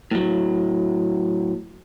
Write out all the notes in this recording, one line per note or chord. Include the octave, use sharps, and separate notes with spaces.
A2 F#3